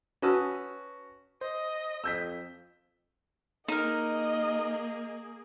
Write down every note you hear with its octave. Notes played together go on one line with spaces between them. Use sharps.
C#4 F#4 B4 A5 D#6 E6
C5 D#5
F2 E6 G6 B6
A#3 D#4 G#4 A#4 D#5